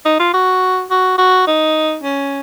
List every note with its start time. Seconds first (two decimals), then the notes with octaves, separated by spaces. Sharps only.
0.05 D#4
0.19 F4
0.33 F#4
0.90 F#4
1.18 F#4
1.47 D#4
2.03 C#4